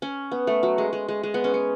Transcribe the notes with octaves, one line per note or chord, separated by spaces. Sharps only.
C#4
B3
A3
F#3
G#3
G#3
G#3
G#3
B3
C#4
B3